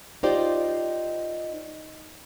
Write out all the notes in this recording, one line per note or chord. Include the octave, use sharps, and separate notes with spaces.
D#4 F4 G4 C5 D5